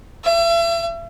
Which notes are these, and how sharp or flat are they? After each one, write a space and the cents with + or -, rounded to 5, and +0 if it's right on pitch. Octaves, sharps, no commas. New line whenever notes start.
E5 +40